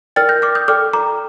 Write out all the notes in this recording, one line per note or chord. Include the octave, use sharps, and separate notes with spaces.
A#4 D5 G5 F6 A6
G6 A#6
D6 F6
D#6 G6
A4 D5 G5 D6 F6
A#5 D6